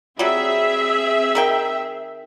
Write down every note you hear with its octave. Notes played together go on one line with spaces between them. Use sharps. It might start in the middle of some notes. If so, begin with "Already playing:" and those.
F#3 G3 C4 G#4 E5
D#3 A#4 G5